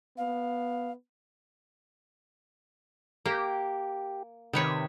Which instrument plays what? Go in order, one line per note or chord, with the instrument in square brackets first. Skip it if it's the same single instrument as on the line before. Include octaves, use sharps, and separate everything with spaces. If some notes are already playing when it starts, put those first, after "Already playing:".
[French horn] B3 [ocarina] F5
[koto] A#3 [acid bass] G4
[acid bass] C3 [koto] D#3 B4 C#5